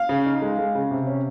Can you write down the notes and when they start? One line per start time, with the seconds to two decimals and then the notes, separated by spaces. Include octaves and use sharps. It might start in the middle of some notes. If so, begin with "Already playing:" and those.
Already playing: F5
0.09 C#3
0.26 D#4
0.42 G#3
0.59 G#3
0.75 C#3
0.91 C3
1.07 C#4